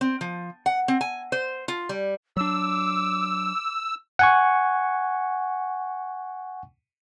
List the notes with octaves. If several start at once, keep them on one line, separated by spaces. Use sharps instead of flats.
C4
F3
F#5
C4
G#5
C5
F4
G3
F#3 D4 D6 E6
F#5 G#5 C#6